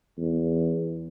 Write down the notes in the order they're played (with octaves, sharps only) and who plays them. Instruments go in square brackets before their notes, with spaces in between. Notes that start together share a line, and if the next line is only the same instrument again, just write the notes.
[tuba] E2